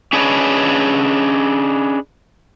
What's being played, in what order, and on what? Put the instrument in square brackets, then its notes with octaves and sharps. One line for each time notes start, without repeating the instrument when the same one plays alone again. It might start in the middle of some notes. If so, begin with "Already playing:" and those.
[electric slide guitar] C#4 D4 G#4 B4 C#5 D#5